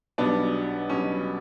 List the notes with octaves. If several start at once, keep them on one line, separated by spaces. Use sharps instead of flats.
B1 B2 G3 B3 D4
B1 B2 G3 C#4